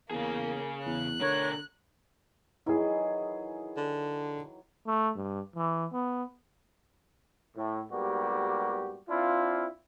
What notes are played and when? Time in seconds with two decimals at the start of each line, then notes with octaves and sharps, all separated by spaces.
0.11 E2 C#3 A#3 G#4
0.86 E2 F#6
1.21 B2 D3 A#4 C#5
2.66 D#3 E3 F#3 E4 G#4
3.77 D3
4.87 A3
5.16 G2
5.56 E3
5.92 B3
7.56 A2
7.91 G#2 G3 A#3 B3 F#4 G4
9.09 C4 D4 E4 F4